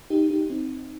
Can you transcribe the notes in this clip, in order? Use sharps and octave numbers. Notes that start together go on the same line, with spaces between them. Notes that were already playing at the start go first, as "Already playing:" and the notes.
D#4 G4
D#4 G4
C4 D#4